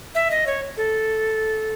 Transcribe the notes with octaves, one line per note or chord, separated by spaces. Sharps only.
E5
D#5
C#5
A4